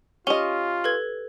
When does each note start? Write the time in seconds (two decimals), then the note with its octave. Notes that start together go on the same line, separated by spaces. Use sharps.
0.27 C#4 F4 G4 D#5 G7
0.84 A4 B4 G#6